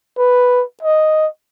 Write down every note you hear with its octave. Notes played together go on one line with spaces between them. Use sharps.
B4
D#5